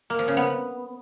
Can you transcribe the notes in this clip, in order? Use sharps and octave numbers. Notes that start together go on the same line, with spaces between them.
A#3
F3
C#3
B3